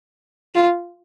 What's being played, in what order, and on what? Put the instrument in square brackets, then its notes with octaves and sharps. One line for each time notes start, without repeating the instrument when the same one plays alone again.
[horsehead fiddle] F4